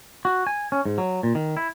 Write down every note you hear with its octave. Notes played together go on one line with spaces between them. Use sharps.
F#4
G#5
C#4
G#2
F#3
A#2
D#3
E4